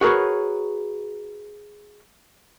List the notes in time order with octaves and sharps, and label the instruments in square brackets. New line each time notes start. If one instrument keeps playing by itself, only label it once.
[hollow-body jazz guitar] F#4 G#4 A#4 B4 C#5